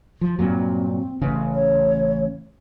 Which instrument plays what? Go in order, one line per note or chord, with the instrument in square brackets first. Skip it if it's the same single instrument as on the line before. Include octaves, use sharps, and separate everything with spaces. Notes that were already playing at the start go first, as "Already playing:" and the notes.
[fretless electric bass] F3
[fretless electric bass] G2 A#2 F#3 [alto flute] C4
[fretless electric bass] A1 C#3 [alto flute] B4
[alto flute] C#5